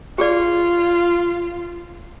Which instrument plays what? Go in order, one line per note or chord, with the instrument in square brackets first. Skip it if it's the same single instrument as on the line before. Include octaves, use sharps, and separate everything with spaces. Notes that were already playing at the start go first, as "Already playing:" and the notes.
[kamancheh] F4 [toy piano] G4 G#4 D5